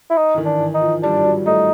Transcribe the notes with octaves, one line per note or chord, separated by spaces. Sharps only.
E4
D#4
E3
D#3
D4
E3
D#4
F3
G3 D4
G3
F#3
A3 D#4